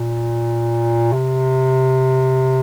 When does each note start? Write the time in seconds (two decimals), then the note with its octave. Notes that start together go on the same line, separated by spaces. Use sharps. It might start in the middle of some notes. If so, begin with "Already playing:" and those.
Already playing: A#2
1.12 C3